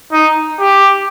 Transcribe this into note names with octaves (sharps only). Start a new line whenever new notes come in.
D#4
G4